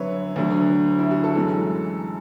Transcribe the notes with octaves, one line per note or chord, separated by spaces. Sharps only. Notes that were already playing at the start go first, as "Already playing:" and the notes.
Already playing: F#2 D3 F#3 B4 C#5 E5
D2 D3 F#3
E4
F#4
A4
F#2 E3 G#3